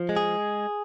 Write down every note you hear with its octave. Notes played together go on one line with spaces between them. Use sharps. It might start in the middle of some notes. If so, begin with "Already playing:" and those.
Already playing: F3
G#3
G#4